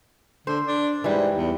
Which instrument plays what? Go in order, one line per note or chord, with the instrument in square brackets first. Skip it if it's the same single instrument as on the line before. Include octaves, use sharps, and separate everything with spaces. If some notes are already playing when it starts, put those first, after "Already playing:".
[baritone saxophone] D3 [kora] C5
[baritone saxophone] D4
[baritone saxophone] G#2 [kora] E3 G3
[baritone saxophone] E2